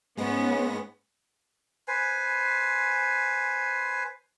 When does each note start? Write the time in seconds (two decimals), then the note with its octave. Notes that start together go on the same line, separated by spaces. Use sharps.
0.17 G#2 G#3 B3 C#4 A#6
1.88 B4 C5 G#5